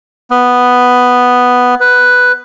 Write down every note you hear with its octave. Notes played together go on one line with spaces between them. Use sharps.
B3
B4